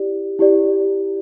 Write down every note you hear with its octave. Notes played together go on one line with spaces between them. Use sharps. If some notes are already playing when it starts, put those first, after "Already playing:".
Already playing: E4 G4 D5
E4 G4 D5